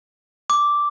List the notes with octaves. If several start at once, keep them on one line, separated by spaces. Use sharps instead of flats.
D6